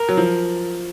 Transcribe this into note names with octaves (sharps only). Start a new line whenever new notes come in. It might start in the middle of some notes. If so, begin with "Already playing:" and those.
Already playing: A#4
F#3
F3